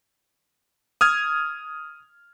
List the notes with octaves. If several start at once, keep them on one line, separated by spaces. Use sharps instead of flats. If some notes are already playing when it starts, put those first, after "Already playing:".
D#6 F6 G#6